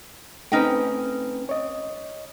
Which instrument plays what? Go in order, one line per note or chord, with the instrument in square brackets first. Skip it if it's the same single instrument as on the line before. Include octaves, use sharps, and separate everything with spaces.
[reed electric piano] A3 C4 B4 [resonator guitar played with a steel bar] C#4 D#4 G5
[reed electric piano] C#5 D#5